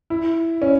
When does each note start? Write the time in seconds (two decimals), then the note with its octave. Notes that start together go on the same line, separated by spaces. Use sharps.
0.10 E4
0.62 C#4